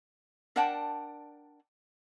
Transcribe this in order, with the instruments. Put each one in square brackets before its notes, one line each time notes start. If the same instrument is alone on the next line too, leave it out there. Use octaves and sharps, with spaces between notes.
[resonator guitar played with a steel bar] D4 A#4 D5 F#5 G5 A5